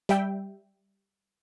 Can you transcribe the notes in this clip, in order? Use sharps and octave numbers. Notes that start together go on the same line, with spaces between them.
G3 E5 G5